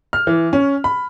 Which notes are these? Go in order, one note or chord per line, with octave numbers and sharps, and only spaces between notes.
F6
E3
C#4
B5